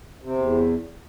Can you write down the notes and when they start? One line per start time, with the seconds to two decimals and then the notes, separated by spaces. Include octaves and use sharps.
0.22 C3
0.38 E2